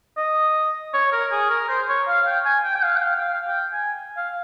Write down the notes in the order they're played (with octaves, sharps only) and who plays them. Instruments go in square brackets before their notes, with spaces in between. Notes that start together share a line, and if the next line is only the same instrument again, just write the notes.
[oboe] D#5
C#5
A#4
G#4
A#4
C5
C#5
F5
G5
G#5
G5
G5
F5
G5
F5
G5
F5
G5
G#5
F5